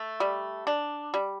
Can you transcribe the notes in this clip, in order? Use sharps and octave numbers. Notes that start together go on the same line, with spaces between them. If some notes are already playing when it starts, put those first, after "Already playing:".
Already playing: A3
G3
D4
G3